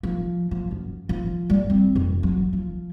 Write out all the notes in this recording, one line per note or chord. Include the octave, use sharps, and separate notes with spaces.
F3
F3
F#2
F3
G3
C4
F2
F#3
F3